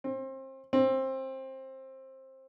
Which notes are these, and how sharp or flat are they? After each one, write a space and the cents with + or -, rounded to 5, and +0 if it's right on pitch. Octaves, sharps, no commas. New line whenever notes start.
C4 +30
C4 +20